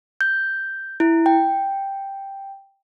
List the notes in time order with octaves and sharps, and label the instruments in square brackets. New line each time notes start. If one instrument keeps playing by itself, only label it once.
[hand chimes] G6
E4
G5